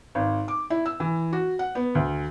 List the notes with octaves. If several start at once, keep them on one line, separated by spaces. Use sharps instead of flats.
G#1
D6
E4
E6
E3
F#4
F#5
B3
D2